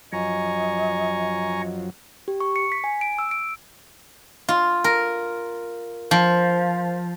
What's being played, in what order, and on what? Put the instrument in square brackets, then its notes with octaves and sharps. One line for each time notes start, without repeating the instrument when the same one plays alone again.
[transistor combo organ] F#2 F3 F#3 [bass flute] D#5 [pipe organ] G#5 A#5 C#6
[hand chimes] G4
C#6
C#7
B6
G#5
D7
E6
D7
[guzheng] F4
A#4
F3